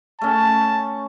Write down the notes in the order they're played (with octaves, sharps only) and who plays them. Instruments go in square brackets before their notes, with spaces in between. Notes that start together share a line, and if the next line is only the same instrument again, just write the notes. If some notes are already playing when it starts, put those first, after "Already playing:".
[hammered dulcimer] A3 C#4 [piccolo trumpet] A5